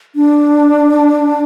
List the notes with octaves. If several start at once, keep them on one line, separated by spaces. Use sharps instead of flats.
D4